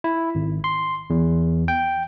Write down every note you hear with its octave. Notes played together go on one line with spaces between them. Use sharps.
E4
G#1
C6
E2
G5